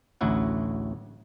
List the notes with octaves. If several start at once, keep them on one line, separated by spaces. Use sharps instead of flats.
A1 D2 F#3 E4 F#5